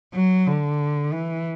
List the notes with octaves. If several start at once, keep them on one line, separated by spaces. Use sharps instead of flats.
F#3
D3
E3